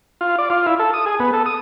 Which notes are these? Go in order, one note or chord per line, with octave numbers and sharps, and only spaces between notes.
F4
D5
F4
E4
A4
D#6
G#4
B3
A4
D#6